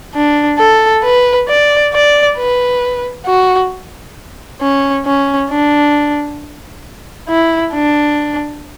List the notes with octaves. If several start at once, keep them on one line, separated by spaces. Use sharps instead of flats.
D4
A4
B4
D5
D5
B4
F#4
C#4
C#4
D4
E4
D4